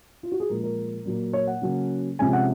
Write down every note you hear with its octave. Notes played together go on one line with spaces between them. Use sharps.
F4
F#4
G#4
A#2 F3 G#3 A#4
A#4
A#2 F#3 A#3
C#5
F#5
C#3 F#3 A#3 C#4
C3 F3 G#3 C#4 G#5
F#5